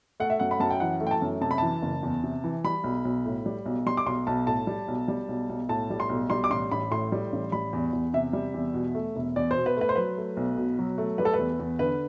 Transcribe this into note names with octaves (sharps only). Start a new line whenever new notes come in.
A3 F#5
E5
F#2 F#5
B5
F#2 A5
G5
E3 F#5
A3
G5
A5
F#2
C3 A5
B5
E3 A5
F#1
E2
C3
E3
G3 B5
B1
B1
A2
G3
B1
G3 C6
D6
B1 C6
B1 A5
A2 A5
G3
B1
G3
B1
B1
A2 A5
G3
C6
B1
G3 C6
D6
A1 C6
A1 B5
A2 C6
G3
A1
G3 B5
E2
E2
C3 E5
G3
E2
B2
A3
E1
E2 D5
B2 C5
B4
A3 B4
C5
F#3 B4
A3
B1
B2
F#3
A3
G3 B4
A4
E2 B4
E2
D3 B4